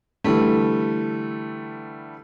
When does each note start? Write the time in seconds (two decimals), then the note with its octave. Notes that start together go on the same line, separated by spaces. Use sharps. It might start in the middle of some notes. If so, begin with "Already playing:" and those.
0.24 D3 E3 G3 A3